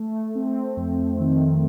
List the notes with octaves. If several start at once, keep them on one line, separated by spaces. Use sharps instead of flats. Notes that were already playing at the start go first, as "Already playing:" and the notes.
Already playing: A3
C4
F2
D#3